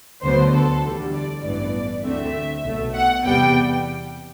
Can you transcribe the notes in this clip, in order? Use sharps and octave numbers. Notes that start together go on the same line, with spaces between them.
D2 D3 F#3 B3 C5
A4
E2 D3 G3
D5
A1 G2 E3 B3 D5
D2 D3 A3 C4 E5
B1 B2 A3
F#5
E2 C3 G3 B3 G5